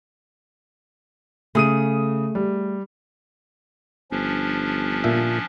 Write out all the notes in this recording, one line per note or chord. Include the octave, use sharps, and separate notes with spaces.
C#3 A3 G#4 D#6 D#7
G3
G1 F3 C#4 D4
A#2 E5